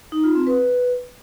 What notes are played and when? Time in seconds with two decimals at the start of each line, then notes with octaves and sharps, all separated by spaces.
0.12 D#4
0.24 F4
0.35 C4
0.47 B4